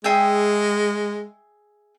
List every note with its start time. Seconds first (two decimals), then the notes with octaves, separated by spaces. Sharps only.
0.04 G#3 G#4 E5 G5